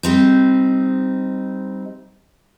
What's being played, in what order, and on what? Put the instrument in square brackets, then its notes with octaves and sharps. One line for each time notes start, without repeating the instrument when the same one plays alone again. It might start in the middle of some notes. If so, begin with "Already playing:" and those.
[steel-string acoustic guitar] G3 C4 D#4